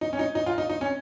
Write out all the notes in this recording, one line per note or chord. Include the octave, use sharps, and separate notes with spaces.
D#4
C#4
D#4
D#4
F4
D#4
D#4
C#4